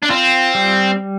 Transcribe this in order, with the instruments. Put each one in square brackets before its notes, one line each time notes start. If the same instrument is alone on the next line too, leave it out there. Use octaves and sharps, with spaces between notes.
[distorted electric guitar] D4
[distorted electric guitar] C4 [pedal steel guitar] F4
[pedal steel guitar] G3